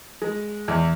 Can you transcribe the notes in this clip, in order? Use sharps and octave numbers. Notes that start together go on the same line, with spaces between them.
G#3
E2